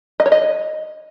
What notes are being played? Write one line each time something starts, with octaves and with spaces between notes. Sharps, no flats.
D#5
C#5
D#5